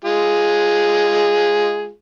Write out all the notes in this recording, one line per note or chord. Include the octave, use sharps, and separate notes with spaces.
G#3 F4 G#4